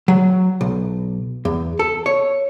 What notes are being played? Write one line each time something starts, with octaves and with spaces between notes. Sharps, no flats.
F#3
B1
E2
A4
C#5